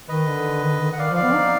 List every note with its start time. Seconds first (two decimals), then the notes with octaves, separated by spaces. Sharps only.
0.08 D#3 B4 D#5
0.27 D3
0.62 D#3
0.71 D3
0.81 D#3
0.93 F#5
0.98 D#3 D5 F5
1.10 F3
1.16 D5 F5
1.22 B3
1.34 D#4